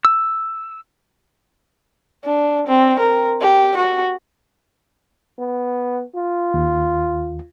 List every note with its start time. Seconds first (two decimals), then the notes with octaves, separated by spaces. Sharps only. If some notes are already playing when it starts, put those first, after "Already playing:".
0.05 E6
2.25 D4
2.68 C4
3.00 A#4
3.41 G4
3.77 F#4
5.39 B3
6.16 F4
6.54 D#2